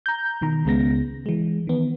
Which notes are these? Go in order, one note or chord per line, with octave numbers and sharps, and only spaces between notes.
A#5 G6
B2 D#3 A#5
C#2 C#3 G#3 B3 A#6
E3 G#3
D#3 B3